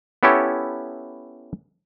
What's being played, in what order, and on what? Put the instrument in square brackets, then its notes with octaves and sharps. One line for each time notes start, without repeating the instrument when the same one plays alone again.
[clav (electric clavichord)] B3 C#4 E4 G4 A4 C#5